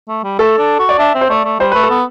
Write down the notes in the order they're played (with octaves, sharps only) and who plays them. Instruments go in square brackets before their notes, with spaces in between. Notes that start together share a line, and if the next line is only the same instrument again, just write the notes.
[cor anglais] A3
G3
[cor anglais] A3 [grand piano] A4
[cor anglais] D4
F#4
[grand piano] D5
[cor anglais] D4 [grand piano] E5
[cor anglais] C4
[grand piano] C5
[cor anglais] A3 [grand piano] D5
[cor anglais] A3
[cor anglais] G3 [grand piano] C5
[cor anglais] A3 [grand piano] B4
[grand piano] A4
[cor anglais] B3